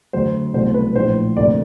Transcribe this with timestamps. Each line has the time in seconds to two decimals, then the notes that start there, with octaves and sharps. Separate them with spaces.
0.13 D2 D3 F#3 C5
0.54 C2 B2 F#3 A3 C5
0.74 B4
0.95 A#1 A2 F3 C5
1.36 D2 C3 F3 A#3 D5